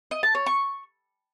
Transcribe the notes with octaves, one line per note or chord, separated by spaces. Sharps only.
D#5
A5
C#5
C#6